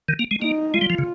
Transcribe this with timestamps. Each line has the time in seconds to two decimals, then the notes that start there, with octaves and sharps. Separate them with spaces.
0.08 D#3
0.19 A#3
0.31 G#3
0.41 A#3 D#4
0.74 G#3 F4
0.81 G3
0.90 F3
0.98 C#3